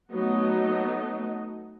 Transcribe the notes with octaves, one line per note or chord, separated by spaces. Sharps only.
F#3 A3 B3 D#4 F#4 D#5